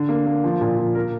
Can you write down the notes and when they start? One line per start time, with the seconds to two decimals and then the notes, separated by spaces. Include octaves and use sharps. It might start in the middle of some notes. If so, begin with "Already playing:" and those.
Already playing: D3
0.09 A#3
0.26 A#3
0.44 F3
0.61 A#2
0.78 F3
0.95 A#3 A#4